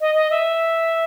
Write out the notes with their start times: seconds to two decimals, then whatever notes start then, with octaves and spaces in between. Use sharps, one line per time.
0.01 D#5
0.15 D#5
0.31 E5